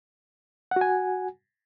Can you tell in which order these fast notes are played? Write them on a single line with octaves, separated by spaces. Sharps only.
F#5 F#4 G#5